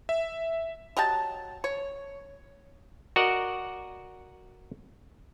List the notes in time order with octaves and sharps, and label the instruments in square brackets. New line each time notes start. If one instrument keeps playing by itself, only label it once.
[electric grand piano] E5
[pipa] F#3 G4 D#5 A5
C#5
[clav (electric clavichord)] F#4 A#4 D5 D#5 F#5